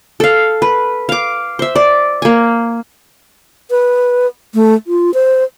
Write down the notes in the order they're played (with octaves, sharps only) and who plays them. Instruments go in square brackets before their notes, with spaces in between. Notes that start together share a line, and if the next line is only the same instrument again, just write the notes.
[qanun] A4 F5
B4
F5 D6
C5 E5
D5
A#3 G#5
[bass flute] B4
A3
F4
C5